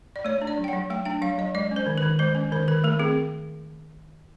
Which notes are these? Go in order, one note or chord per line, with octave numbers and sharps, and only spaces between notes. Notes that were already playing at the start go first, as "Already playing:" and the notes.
D5
A3 C#5
D4
D5
F#3
G5
F#5
F#3
A3 G5
D4 G5
F#3 F5
F#3 D#5
G#3 D5
C#4
C5
D#3
B4
D#3
G#3 C5
C#4
D#3 C5
D#3 B4
A3 A#4
C4 G#4